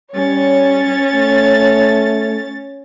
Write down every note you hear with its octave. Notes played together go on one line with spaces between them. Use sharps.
G3 C#4 C#5 A6
A3